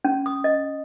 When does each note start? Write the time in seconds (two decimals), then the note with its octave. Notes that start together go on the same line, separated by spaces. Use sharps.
0.05 C#4
0.26 D#6
0.44 D#5